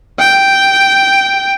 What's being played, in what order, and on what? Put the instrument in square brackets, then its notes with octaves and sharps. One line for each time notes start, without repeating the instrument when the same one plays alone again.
[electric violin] G5